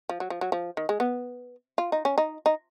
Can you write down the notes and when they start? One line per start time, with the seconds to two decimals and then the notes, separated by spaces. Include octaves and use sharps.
0.09 F3
0.20 F#3
0.30 F3
0.41 F#3
0.52 F3
0.77 D#3
0.89 G#3
1.00 B3
1.78 F4
1.92 D#4
2.05 C#4
2.18 D#4
2.46 D#4